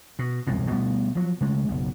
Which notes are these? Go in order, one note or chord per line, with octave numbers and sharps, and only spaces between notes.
B2
E1 C2 F#2 A2
B2 G3 A3 B3
F3 F#3
C#3 G#3 A3
F#1 B1